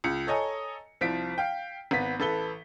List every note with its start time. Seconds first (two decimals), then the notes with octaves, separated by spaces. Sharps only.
0.04 C#2 C#7
0.27 A4 C#5 D#5 G#5 A#5
1.01 C2 F3 B6 D7
1.38 F5 G5
1.91 G#1 B3 B6
2.20 A1 A4 B4 G7